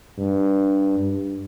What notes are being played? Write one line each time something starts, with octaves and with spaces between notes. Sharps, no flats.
G2
G2